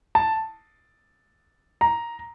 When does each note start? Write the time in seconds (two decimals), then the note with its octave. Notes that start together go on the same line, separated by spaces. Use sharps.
0.15 A5
1.81 A#5